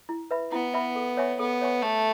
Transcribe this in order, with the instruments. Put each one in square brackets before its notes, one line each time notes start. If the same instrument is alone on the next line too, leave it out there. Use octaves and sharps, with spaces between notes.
[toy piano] E4
B4 E5 B5
[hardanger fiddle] B3 [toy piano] E4
[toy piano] B4 E5 B5
A4
C#5 E5 G#5 C#6
[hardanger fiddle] B3 [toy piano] A4
[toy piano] C#5 E5 G#5 C#6
[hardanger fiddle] A3 [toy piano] A4